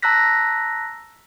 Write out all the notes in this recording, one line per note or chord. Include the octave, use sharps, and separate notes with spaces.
A5 A#5 E6 F#6 A#6 B6